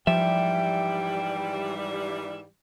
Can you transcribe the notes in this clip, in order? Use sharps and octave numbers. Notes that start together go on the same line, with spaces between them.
G#2 E3 F3 G3 E5 G5